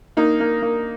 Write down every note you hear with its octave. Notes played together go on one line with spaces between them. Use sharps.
A#3 D#4
A#3
A#3